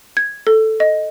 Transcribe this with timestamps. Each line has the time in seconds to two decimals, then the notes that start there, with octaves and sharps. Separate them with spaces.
0.17 G#6
0.47 A4
0.80 D#5